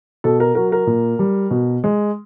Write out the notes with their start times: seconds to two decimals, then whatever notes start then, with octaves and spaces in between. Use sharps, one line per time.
0.24 B2 A4
0.40 A#4
0.55 F#3 A#4
0.72 A#4
0.87 A#2
1.19 G3
1.51 B2
1.84 G#3